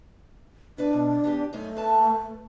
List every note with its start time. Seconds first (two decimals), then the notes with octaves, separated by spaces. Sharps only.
0.78 D4 E4 B4 D5
0.93 B2
1.24 E3 B3 G4
1.53 F#2 A3 D#4
1.77 B4 A5